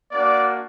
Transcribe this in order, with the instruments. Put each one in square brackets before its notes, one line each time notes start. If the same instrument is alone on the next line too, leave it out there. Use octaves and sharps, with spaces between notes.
[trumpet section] A#3 D4 F#4 D5